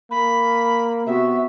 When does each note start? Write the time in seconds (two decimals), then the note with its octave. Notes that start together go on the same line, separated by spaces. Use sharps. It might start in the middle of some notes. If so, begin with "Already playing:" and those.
0.11 A#3 B5
1.07 C3 B3 F#4 E5